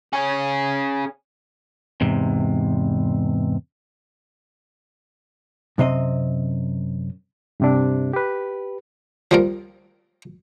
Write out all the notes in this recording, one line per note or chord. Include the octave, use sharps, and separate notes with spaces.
C#4 G#4
E2 G#2 C3
F#2 C3 C4 D#5
G2 C3 D4
G4 B4
F3 G3 A#4